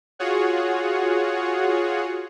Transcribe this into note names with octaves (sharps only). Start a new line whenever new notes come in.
F4 F#4 G#4 C#5 F#5